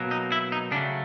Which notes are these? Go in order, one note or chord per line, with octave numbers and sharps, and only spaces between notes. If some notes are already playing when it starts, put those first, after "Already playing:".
Already playing: B2 F#3 A#3
D#4
E4
D#4
C#3 F#3 A3 D4